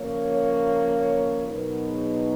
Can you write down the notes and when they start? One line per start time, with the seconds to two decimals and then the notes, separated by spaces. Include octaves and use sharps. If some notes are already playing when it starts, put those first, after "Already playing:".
Already playing: C#3 F3 A#3 C#5
1.47 B2 F#3 B3 D#4 A#4
1.87 G#4